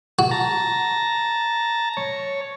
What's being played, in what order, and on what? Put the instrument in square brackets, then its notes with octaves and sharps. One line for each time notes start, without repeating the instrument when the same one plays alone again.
[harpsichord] F#4
[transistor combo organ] A5 A#5
C#5